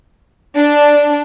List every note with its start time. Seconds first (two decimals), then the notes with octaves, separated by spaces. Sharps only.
0.56 D4